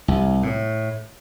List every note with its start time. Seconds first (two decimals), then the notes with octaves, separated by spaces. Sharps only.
0.08 C2
0.43 A2